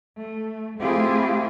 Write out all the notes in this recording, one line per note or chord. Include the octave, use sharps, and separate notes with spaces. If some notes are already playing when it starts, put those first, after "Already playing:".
A3
A3 C4 E4 F4 G4 G#4